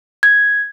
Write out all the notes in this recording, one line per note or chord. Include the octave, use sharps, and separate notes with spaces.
G#6